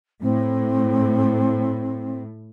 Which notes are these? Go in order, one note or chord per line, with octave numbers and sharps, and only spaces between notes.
A2 C4